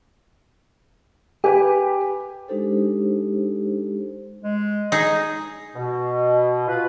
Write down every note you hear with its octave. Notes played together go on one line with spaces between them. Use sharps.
G4 B4 G#5
G#3 D4 D#4 G4 A4 C5
G#3
D#4 G#4 D#5
B2
F4 B4